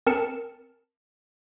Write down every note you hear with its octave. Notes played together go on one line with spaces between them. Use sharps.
C4 A#4 A5 C#7 E7